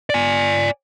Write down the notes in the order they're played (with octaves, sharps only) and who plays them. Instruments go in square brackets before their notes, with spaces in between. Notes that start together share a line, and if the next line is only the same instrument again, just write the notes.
[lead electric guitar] D5 G#5